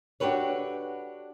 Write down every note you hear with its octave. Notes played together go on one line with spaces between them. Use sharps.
D4 F#4 G4 A4 B4 C#5